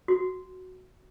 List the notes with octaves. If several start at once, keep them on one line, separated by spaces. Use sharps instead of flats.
F#4